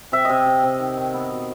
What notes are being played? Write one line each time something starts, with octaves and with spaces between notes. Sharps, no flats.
C3 E5
C3 D#5
C3
C3
D#3
D#3
B3
B2